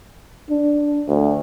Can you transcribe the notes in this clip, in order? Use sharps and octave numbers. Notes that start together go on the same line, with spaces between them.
D4
D2